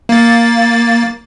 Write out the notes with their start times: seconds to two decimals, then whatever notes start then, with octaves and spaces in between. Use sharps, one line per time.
0.09 A#3 A6